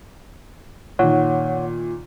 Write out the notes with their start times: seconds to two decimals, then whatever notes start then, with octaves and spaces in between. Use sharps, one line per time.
0.99 A#2 D#3 C#5 F#5